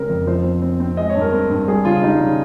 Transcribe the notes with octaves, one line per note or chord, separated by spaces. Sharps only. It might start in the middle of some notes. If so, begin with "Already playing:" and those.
Already playing: C#3 G#3 C4 A#4 C5
F2
F3 C5
C4
C4
C4
G#3 D#5
C#5
G2
A#4
C4
G2
G3 G#4
C#3 F4
G3 D#4
C#3